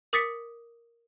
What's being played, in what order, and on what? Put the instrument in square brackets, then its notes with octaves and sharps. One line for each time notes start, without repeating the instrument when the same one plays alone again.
[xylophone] A#4 D6 D#6 A6 B6 C#7